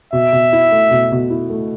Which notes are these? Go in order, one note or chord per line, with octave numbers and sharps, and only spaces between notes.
B2 E5
B2
E4
A3
B2
B2
E4
A3